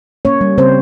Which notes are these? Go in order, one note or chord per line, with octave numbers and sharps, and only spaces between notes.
A#3 C#4 C#5
G3
C#3 C4 C5